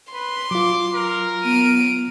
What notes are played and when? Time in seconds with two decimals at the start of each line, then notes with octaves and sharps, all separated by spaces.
0.13 B4 C6
0.51 F#3 F4 D6
0.94 A#4
1.44 B3 D7 D#7